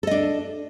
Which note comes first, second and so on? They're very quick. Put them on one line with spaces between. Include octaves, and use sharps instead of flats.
A4 D#5 D4